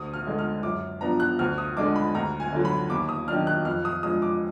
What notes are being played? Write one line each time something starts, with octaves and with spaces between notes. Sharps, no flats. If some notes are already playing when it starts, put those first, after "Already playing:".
Already playing: D2 D#6
F6
D3 G#3
F6
F#2 D6
F3 B3 D4 A#5
F#6
D2 F6
D#6
D3 G#3 D4 D6
B5
D2 A#5
G#5
D3 F#3
B5
D#2 D6
D#6
D#3 F#3 D4 F6
F#6
F2 F6
D#6
F3 G#3 D4 D#6
D6